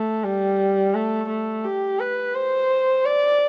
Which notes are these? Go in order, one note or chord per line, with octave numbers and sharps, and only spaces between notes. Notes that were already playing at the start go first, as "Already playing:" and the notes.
Already playing: A3
G3
A3
A3
G4
B4
C5
D5